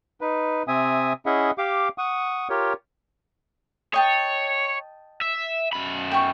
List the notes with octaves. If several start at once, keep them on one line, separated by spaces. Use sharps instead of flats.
D#4 B4
C3 C4 E5 G#5 D#6
C#4 E4 G#4 D#5 E5 F#5
G4 F5 D6
F#5 C#6 D#6
F4 G4 A#4 C#5
C#5 D#5 G5 A5
E5
F#2 B5
G5 C#6